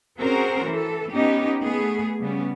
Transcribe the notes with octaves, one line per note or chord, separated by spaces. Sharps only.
C4 C#4 F#4 G#4 A#4 C5
E3 A4
B3 C#4 D#4 G4
A3 B3 G#4
C#3 G3 B3 C#4